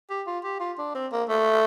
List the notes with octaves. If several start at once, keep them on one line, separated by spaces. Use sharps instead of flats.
G4
F4
G4
F4
D4
C4
A#3
A3